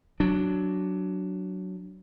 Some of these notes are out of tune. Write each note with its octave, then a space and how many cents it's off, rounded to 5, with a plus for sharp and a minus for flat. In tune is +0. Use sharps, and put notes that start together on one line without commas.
F#3 +5 D4 +0